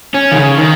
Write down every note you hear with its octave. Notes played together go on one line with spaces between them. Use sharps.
C#4
D#3
C#3
D#3